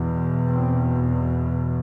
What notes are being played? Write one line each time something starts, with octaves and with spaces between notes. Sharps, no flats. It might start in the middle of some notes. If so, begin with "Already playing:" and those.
Already playing: E2 B2
C4